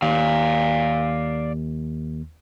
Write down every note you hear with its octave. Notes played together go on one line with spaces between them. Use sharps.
D#2 D5 F5